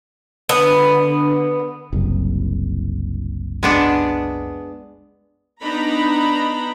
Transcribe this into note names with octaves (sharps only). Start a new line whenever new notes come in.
D3 B3
F#1 C2
G#3 B3 D4
B3 D4 D#4 A#5 B5